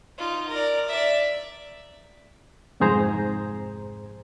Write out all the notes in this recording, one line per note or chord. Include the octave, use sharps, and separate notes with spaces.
D#4 F4
A#4 D5
D5 E5
C2 F2 G#2 G#4 C5 A#5